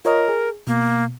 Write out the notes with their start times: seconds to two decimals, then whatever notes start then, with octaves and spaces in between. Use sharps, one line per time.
0.05 F4 A#4 C#5 D#5
0.28 G#4
0.67 B2 A#3